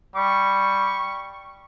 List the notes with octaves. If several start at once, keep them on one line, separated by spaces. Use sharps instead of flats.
G3 C#6